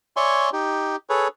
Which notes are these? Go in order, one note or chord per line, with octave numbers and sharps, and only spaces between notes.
C#5 D5 E5 G#5 C6 C#6
D#4 G4
G#4 A4 B4 C#5